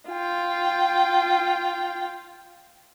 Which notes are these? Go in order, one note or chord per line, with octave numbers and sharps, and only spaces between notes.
F4 G5